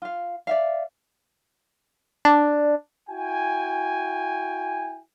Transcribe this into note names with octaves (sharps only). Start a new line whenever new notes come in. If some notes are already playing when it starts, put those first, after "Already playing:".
F4 F5
D5 E5 F5
D4
E4 F#4 G5 G#5